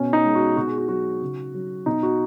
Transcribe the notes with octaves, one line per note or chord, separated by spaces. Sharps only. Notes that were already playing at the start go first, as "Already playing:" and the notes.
Already playing: B2 C#4
D#4
G#3
F#4
B2 F#4
G#4
F#4
F#3 F#4
C#3
F#3
B2 D#4
F#4